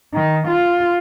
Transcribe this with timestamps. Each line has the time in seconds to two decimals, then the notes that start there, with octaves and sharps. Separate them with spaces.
0.13 D#3
0.47 F4